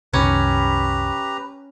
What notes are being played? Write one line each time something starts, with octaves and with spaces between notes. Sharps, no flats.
C2 F#2 D#3 C#4 G4 B4 A#5